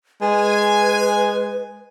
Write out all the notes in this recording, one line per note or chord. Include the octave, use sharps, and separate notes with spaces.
G#3 B4 G#5